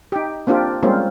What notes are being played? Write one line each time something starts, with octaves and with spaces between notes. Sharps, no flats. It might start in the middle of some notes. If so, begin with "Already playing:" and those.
D#4 G4
A#3 C4 D4 F4 G4
G3 G#3 A#3 C4 C#4 F4